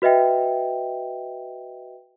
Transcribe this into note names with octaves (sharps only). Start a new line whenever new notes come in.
F#4 B4 D#5 E5 G5